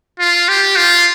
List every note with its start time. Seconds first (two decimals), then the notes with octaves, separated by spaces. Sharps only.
0.20 F4
0.49 G4
0.76 F4